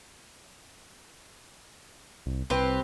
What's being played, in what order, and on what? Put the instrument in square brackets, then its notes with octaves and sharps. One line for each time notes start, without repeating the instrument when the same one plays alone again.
[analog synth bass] C2
[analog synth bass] C2 [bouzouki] C4 G4 B4